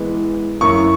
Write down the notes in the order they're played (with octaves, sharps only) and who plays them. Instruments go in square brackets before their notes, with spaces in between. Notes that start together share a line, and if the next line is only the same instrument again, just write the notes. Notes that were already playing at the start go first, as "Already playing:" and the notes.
Already playing: [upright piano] E3 G#3 B3
[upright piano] F#2 E3 A#3 E4 [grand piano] C#6